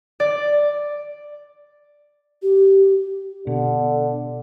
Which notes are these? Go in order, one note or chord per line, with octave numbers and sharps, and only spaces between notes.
D5
G4
B2 D3